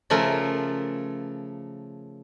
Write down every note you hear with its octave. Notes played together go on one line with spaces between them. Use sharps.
C#3 F3 A3 A#4